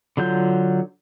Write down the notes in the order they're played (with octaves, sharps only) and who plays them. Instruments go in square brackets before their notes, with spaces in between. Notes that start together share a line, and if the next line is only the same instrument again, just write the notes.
[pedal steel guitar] D3 F#3 F4 G6